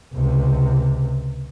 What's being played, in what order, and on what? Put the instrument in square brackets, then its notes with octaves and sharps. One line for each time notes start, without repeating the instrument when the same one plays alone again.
[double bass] C#2 C3